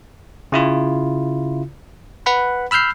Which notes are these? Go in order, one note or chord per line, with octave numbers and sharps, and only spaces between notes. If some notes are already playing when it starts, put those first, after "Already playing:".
C#3 E4 F4
B4 F#5 B5
B5 E6 F6 G6 C7